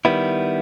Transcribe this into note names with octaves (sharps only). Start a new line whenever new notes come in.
D#3 G3 B3 E4